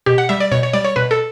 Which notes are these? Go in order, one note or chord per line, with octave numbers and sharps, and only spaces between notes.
B2 G4
F#5
G3 E5
D5
B2 C#5
C#5
G3 D5
C#5
B2 B4
A4